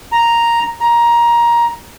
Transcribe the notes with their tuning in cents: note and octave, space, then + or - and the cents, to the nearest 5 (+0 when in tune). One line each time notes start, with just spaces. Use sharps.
A#5 +0
A#5 +15